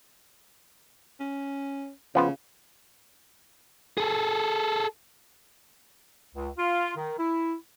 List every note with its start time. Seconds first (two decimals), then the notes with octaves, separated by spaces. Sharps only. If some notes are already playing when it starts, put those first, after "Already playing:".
1.20 C#4
2.15 C#3 F3 B3 F4
3.98 G#4 A4
6.35 C#2
6.58 F4
6.97 D#3
7.19 E4